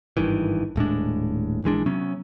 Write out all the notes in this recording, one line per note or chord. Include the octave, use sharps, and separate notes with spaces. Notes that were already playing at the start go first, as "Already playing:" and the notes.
G#1 G2 D#3 E3
D#1 A2 G#3 D4
A#1 E3 G#3 D4
C3 F#3 B3 C#4